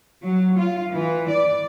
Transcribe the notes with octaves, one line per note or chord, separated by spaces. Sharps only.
F#3
F4
E3
D5